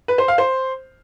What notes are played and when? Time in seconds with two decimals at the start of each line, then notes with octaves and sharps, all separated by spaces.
0.08 B4
0.18 C5
0.28 F5
0.38 C5